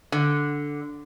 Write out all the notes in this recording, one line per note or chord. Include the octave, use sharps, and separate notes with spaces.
D3